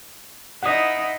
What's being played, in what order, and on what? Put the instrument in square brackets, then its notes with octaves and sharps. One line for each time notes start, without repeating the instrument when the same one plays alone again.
[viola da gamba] D#4 E4 [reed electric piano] F#5 D#6